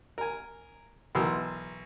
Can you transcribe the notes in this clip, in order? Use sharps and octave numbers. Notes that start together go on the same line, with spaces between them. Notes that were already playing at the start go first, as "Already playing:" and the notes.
A#4 G#5
B1 E3 A#4 C6 D#6 E6